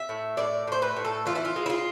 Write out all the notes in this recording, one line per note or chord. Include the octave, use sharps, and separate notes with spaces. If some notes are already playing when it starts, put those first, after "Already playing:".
Already playing: E5
A2
A2 D5
A2 C5
B4
A2
A4
E3 F4
E4
F4
G#3
E4
F4